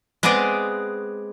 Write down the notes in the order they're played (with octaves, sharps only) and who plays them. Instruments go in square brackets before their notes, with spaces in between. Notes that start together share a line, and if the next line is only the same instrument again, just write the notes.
[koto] G#3 B3 C4 G#4 D5 D#5